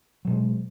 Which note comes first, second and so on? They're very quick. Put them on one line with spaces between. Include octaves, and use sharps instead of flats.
F#3 B2 G#3